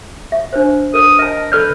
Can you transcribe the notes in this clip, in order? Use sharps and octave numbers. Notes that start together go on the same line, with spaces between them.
E5
D4 B4 C5
A#4 B4 D#6
A#4 D#5 A5
A4 B4 D5 F6 G6